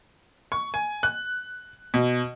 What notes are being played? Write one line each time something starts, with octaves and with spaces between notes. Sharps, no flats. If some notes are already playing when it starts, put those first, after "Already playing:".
C#6
G#5
F#6
B2